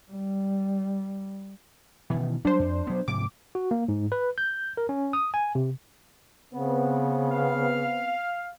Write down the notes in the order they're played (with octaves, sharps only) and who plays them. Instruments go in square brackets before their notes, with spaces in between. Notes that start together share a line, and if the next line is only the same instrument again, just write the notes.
[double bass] G3
[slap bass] B2 D#3 [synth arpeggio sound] E3
[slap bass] F#3 G3 [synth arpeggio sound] D4 C5
[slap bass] F2
F#3 B3
[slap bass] G#2 C3 F3 [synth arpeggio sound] D6
[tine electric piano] F#4
A#3
G#2
B4
G6
A#4
C#4
D#6
G#5
C3
[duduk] C#3 [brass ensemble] B3 C4
[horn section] F5